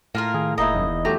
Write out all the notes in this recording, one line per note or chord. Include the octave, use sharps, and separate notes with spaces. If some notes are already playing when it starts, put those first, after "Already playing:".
A2 A#3 F4 A#4
D#3 G#4
E1 A#3 D#4 E4 D#5
D#1 F#2
E2
F#3 A3 G4 A#5